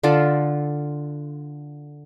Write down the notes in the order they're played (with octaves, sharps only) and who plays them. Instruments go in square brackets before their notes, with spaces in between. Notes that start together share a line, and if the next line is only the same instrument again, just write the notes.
[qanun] D3 F4 A4 D5